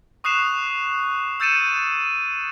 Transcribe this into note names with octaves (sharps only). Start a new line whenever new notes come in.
C#6 D#6 F#6 C7 E7 F7
E6 G6 A6 C#7 D#7 E7